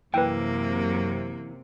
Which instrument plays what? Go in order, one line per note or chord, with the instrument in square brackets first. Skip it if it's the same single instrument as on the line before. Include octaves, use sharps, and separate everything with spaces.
[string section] F#2 C3 [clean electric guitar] E3 [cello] A#3 [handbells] B4 G5